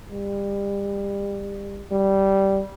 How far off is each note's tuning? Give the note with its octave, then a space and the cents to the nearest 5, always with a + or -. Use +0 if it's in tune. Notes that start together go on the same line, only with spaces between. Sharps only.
G3 +30
G3 -10